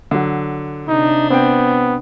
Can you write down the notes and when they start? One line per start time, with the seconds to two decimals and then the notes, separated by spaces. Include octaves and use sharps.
0.11 D3 F#3
0.88 C3 D4 D#4
1.30 B3 C4 G5